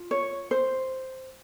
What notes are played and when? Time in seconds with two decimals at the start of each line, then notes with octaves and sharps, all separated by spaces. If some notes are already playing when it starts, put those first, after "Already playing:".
Already playing: F4
0.11 C#5
0.51 C5